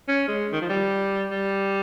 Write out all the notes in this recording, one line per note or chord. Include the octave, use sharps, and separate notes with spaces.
C#4
G#3
D#3
F3
G3
G3